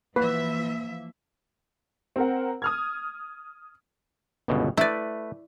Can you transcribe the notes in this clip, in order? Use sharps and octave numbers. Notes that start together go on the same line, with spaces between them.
E3 F3 A#3 B4 E5
C4 A#4 F#5
D#6 F6 G#6
G1 C#2 B2
A3 E4 B4 D5